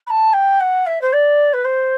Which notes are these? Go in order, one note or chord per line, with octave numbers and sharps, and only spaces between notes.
B5
A5
G5
F#5
E5
C5
D5
B4
C5